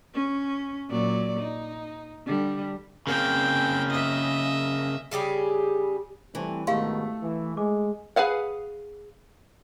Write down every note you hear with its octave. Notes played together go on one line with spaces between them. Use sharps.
C#4
A#2 F#3 D5
D#4
D3 G3
C#3 A#3 C4 G5
D#5 E5
C#3 G3 G4 G#4
E3 G3 A3 C4
G#2 B2 D#3 A3 G4 F5 C6
E3
G#3 D6
G#4 B4 F5 F#5